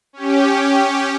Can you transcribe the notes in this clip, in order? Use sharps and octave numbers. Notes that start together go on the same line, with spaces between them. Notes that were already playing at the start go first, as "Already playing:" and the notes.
C#4 G4